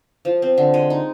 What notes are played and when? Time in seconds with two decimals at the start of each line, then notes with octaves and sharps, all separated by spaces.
0.25 F3
0.42 C4
0.58 D3
0.74 G#3
0.90 D#4